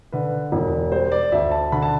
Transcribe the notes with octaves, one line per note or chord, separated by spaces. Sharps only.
D3 B4
E1
G3 C5
D5
D2 E5
A5
D3 B5
A5